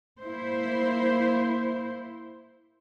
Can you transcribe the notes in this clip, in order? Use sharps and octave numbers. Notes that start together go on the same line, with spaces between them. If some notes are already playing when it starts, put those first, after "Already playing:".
A#3 E4 C5